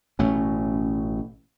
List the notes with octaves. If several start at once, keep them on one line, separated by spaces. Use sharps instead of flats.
A1 B2 A3 C#4